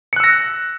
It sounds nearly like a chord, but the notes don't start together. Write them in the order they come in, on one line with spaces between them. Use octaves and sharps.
C#7 F#6 E6 A#6